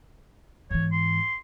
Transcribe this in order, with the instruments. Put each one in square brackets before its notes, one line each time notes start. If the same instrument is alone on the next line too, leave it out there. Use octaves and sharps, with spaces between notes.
[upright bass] G#2 E3 [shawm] C#5
[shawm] C6